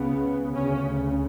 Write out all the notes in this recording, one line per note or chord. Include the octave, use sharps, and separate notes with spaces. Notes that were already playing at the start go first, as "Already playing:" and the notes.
Already playing: C#2 C#3 B3
D2 C#3 C#4